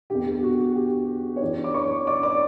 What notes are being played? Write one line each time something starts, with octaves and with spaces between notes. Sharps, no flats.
E2 D3 G4
G4
F#4
F#4
G4
C#5
F#2 E3 D4 D5
D6
C#5 C#6
D5 D6
D5 D6